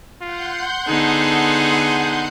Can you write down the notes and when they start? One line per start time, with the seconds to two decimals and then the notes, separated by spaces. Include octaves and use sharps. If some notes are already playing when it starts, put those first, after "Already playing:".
0.21 F4 F#5 C6 G6
0.88 D3 B3 D#4 G#4 A4